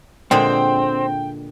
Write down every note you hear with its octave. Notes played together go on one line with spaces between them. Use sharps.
A#2 D3 G#3 C4 G5